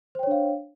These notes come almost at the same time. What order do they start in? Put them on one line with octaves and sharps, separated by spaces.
C5 G5 C#5 D4 F5